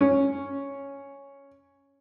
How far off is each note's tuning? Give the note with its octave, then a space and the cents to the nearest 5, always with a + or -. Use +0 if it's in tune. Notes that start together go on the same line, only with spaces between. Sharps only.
C#4 +0